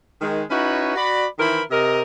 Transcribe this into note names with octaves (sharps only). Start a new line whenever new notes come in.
D#3 G#3
C#4 D#4 E4 F#4 B4 C#5
F#4 D5 B5
D#3 E3 E4 A#4 C5 B5
C3 A#4 D#5